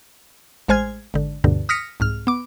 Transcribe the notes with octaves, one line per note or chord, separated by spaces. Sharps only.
A1 G#3 C5 G#5 F6 G#6
G#1 D3
D2 G2 B2 D3
D#6 F6 A#6 B6 C#7
C2 G#2 F6
B3 D6